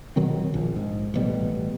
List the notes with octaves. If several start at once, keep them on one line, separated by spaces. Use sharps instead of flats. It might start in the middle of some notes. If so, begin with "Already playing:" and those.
B2 D#3 F#3 C4
A#1
G#2
A1 B2 G3